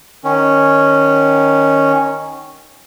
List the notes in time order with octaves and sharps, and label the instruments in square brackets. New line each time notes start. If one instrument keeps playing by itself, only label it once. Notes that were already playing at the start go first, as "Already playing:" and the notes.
[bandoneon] D#3 C#4